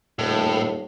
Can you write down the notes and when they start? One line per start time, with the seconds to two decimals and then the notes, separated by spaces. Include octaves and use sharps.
0.19 D#1 A2